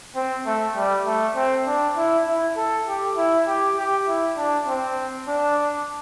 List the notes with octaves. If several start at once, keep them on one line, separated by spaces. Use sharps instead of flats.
C4
A3
G3
A3
C4
D4
E4
E4
A4
G4
E4
G4
G4
E4
D4
C4
D4